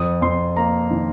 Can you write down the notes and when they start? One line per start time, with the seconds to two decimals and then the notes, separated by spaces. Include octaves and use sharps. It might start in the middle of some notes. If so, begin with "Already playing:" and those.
Already playing: F2 D#6
0.21 F2 C6
0.56 A#3 A#5
0.91 D#3